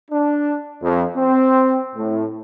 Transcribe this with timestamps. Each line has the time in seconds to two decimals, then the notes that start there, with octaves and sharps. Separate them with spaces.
0.10 D4
0.81 F2
1.15 C4
1.95 A2